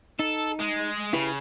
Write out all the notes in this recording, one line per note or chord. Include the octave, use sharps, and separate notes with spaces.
D#4 A4
G#3
C#3 E4 G4 B4